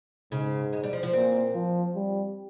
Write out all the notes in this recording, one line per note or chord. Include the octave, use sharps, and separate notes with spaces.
G#2 C#3
G#3
G3
F3
F3
A#2 C4
F3
G3